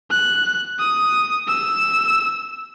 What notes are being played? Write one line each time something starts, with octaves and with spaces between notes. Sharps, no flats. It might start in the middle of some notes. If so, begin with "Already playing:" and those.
F#6
D#6
E6